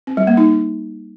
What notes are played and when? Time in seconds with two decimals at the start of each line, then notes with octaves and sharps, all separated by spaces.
0.07 C4
0.17 G3
0.27 A#3
0.37 D#4